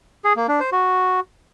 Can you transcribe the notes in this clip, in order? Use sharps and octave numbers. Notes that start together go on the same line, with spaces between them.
G#4
A#3
D4
C5
F#4